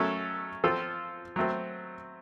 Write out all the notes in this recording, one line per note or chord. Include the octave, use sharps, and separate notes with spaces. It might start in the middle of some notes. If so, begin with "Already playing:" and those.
Already playing: F#3 A3 C#4 A4
F3 C4 F4 A4
F#3 A3 C4